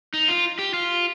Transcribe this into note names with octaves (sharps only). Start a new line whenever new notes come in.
D#4
F4
G4
F4